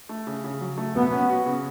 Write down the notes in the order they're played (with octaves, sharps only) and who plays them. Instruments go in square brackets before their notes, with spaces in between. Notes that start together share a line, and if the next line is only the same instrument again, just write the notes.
[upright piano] A3
C#3
C#3
F#3
A3
[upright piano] F#3 [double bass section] B3
[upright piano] C#4
F#4
C#3